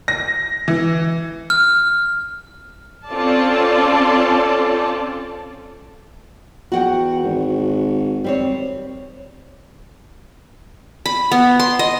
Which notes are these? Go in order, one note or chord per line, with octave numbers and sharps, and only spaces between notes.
A#6
E3
F6
C4 C#4 F4 A4 D5 A5
E2 F#4 F#5 G5
G#1
G3 C4 C#5
B5
B3
C6
D#5